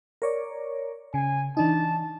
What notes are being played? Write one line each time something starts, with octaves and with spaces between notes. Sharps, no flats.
A#4 C#5 D5
C#3 G#5
E3 D4 D#4 A5